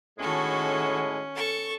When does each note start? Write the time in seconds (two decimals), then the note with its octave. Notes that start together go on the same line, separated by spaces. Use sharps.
0.19 A2 D#3 G#3 C#4 F#4 A4
1.35 A4 C#6